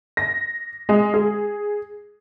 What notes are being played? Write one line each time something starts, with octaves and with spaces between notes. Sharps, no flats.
A#6
G#3
G#4